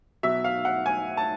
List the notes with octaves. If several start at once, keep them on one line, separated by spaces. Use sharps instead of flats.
B2 F#3 E5
F5
F#5
G#5
A5